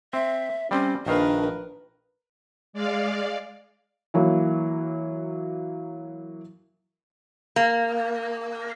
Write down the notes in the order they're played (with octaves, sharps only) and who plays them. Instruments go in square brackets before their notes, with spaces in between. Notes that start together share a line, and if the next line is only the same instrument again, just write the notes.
[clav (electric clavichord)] C4 [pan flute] E5
[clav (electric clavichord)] G3 C4 [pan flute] C#4
[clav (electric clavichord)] A#1 D#3 F5 [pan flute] D4 [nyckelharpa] A#4 B4
[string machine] G#3 D5 F5
[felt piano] E3 F#3 A#3
[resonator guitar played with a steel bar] A#3